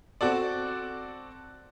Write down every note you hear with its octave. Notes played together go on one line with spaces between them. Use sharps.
C4 F#4 A4 D5